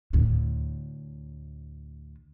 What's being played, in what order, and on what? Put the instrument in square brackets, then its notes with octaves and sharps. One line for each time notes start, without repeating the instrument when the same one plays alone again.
[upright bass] D2 A2